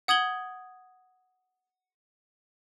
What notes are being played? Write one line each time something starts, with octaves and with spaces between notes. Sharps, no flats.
F#5 D#6 G#6 F#7 G7